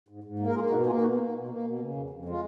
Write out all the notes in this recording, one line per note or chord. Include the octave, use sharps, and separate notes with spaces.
G#2
G#2
A#3
A#4
A#3 F4 G#4
B2 D#4 F#4
A#3 F4 G#4
B2 D#4 F#4
A#3
B2
A#3
B2
C#3
F2
F2
G#3 F4